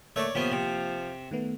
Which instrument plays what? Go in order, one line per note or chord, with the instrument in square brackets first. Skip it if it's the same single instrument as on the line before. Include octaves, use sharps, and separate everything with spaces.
[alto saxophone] A3 [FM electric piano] A#3 E6 [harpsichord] C#5 D5
[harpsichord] C3 B3 C#4 [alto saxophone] F3 [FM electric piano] A#3
[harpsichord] C3
[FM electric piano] D#3 A3 B3